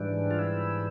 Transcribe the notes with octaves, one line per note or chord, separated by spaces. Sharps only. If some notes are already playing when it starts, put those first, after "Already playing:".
Already playing: G#2 E3 G3 D4
F4
E4